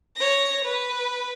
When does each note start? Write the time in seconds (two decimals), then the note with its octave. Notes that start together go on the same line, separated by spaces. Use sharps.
0.16 C#5 A#6
0.64 B4